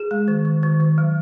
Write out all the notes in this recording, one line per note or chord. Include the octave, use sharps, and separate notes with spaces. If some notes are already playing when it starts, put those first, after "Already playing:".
Already playing: G#4
G#3
D#3
D#3
D#3
D#3
F#3